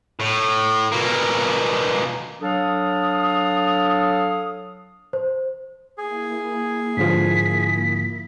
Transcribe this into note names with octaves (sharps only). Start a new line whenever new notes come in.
A2
B2 A#3
F#3 D4 A4 F5 D#6
C5
A#3 E4 G#4
G#2 D3 F3 B6